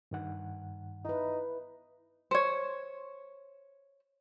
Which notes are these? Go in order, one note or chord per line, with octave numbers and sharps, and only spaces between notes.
G2 D#3 F#5
D#4 E4 B4
C5 C#5